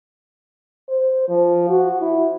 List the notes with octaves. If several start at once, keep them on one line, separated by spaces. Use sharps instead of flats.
C5
F3
F#4
E4